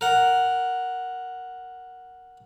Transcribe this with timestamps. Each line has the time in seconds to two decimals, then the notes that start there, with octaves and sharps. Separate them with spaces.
0.01 A#4 F#5